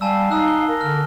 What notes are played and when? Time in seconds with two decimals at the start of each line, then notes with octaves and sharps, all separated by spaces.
0.01 G3 F5 G#5 A5 E6
0.31 D#4 E6 F#6
0.48 G7
0.68 A#4
0.81 D3 F6